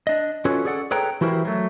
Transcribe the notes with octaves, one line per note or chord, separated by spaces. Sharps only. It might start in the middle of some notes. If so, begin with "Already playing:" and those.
D4 D#5
C#4 F4 F#4 A4 B4 C#5
G#4 A4 D5 F#5
G#4 A4 B4 C#5 G5 A#5
E3 E4 F#4 G4 A#4 C5
F#3 A3